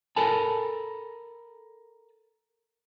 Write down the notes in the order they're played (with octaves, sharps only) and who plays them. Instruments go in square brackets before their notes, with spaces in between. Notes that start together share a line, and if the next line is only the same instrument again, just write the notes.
[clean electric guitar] A4 A#4 G#5 A5 B5